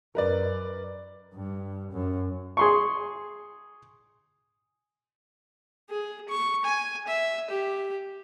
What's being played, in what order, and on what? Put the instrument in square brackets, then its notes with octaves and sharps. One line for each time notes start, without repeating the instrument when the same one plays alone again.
[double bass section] F#2 [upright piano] A#4 B4 D5
[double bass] G2
F#2
[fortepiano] G#4 C6 C#6
[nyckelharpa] G#4
C#6
G#5
E5
G4